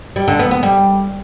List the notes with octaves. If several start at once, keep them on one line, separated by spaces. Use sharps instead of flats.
G3
D3
B3
B3
G3